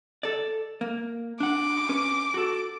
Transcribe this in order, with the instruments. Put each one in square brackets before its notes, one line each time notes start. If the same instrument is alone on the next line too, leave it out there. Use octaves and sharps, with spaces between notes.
[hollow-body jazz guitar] A4 D5
A#3
[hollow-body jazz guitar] D4 F#5 [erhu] D6
[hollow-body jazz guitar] C#4 B4
F#4 A4